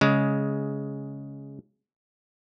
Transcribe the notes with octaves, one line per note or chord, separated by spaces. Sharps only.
C#3 G#3